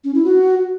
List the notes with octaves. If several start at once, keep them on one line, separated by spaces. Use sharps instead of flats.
C#4
E4
F#4